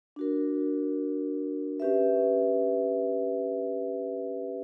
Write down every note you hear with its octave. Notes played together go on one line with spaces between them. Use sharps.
D4 F#4 A#4
C#4 G4 B4 E5